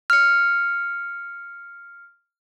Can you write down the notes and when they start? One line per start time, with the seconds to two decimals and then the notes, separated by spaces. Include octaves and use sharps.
0.10 F6 C#7